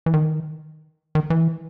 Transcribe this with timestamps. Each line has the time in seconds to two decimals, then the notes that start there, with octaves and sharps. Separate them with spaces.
0.06 E3
0.14 D#3
1.15 D#3
1.30 E3